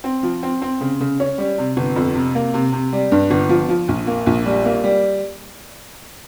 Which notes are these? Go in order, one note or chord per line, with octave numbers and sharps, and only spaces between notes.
C4
F3
C4
C4
C#3
C#3
C#4
G3
C3
G1
F2
C3
A#3
C3
C3
G3
G2
G1
F3
F3
A#1
A#3
A#1
G3
A#3
G3